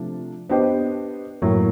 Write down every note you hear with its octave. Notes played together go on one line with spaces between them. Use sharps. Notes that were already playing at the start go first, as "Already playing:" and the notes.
Already playing: C3 F3 A3 D4
B3 D4 G4 C5 D#5
A2 F#3 A#3